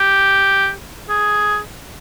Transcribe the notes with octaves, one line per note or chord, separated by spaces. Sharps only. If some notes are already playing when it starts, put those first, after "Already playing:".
Already playing: G4
G#4